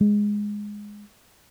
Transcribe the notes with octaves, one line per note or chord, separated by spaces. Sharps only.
G#3